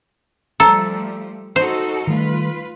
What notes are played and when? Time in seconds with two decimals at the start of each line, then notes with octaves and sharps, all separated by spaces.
0.60 F3 G3 A3 A4 A#5
1.56 D#4 F#4 A4 C5
2.07 D#3 G3 A3 F4 B4